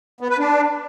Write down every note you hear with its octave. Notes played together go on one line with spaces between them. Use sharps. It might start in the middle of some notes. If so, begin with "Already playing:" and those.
B3
B4
D4